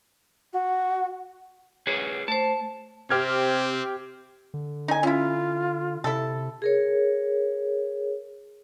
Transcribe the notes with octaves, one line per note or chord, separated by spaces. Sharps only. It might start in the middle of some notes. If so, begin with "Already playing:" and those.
F#4
G#4 B4 C#5
A3 C5 A5
C3 C4 G4 F6 G#6
D3
D#4 G#5
C#4 E4 F4
C3 E4 A4
G#4 A#4 C#5